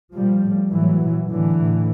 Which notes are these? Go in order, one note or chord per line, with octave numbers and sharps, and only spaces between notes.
A#2 F3 G3
A2
A2 E3 F#3
A#2
A2 D3 E3
A2